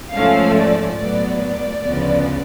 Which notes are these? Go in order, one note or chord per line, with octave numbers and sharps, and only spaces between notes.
G#2 F3 A3 C#4 F5
D5
A2 F#3 B3 D5
D5
D2 C#3 F3 B3